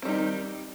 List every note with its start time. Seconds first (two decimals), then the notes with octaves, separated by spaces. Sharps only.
0.02 C4
0.05 G3
0.08 D#4
0.11 D#3